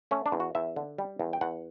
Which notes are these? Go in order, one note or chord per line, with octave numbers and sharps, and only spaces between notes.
A3 C#4
D4
E2
F#4
E2 E5
D3
G3
E2
G5
E2 F#5